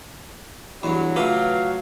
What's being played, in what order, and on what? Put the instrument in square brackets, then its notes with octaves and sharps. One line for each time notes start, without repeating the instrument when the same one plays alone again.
[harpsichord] E2 G2 [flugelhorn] F#3 [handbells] B5
[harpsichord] C#3 A3 G4 [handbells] F4 B4 D6 [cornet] F5